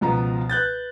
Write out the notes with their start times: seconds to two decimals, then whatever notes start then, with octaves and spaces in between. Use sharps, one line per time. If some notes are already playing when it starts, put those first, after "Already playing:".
0.01 C#2 B2 F3 B3 A#5
0.50 B4 F#6 G6 A6